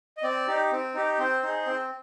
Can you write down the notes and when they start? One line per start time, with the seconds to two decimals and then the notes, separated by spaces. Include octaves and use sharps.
0.17 D#5
0.23 C4 D5
0.48 D#4 G4
0.72 C4
0.94 D#4 G4
1.18 C4 C5
1.43 D#4 G#4
1.66 C4